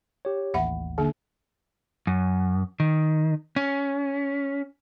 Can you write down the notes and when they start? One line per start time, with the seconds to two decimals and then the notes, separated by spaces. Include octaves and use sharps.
0.25 G4 C#5
0.54 A1 D#2 E5 F#5 B5
0.98 D3 A#3 D4
2.07 F#2
2.80 D#3
3.56 C#4